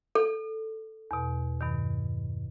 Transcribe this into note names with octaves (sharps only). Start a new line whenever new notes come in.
A4
E2 B2
G2 B2 D#3